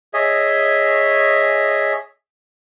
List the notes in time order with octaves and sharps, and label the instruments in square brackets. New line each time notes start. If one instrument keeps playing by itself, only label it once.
[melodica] G#4 C#5 D#5 E5